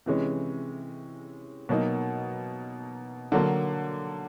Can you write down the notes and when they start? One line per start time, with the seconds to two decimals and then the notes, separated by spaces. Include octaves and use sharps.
0.06 C3 E3 G#3 C#4
1.69 B2 F#3 A#3 D#4
3.32 D3 F#3 A#3